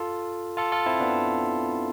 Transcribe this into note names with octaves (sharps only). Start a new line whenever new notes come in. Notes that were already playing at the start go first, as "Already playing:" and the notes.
Already playing: F4 A4
F4 A4
F4 A4
C4 E4
B3 D4